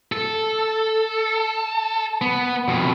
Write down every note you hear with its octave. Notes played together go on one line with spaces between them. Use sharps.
A4
B3
F2 B2